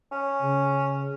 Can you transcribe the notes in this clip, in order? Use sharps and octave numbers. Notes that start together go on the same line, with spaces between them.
C#4
C#3